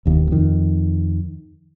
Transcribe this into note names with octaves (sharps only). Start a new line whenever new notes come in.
E1 D#2
F2 D#3